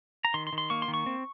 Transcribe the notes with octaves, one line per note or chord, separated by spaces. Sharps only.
A#5
D#3 C6
C6
D#3
C6
A#3 C#6
C6
D#3
C#6
C4